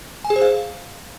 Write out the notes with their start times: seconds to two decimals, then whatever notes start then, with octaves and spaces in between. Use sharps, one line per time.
0.24 G#5
0.30 G#4
0.36 C5
0.42 F5